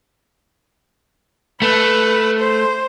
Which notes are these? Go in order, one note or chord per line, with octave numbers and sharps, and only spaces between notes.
A3 B4
C5